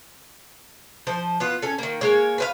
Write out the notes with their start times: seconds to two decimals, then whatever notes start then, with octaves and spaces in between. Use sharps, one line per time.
1.07 F3 C5
1.40 B3 F4
1.62 C#4 A4
1.78 D#3 A#3
2.01 G#3 A#3 C#5
2.38 B4 C5 F5